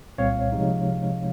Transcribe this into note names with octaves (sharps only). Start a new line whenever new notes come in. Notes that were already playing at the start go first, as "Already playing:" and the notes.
C2 A#2 G3 C4 C#5 F5
C3 F3 G#3 D#4